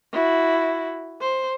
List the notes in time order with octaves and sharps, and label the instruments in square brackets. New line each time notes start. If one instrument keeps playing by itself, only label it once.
[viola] E4 F#4
C5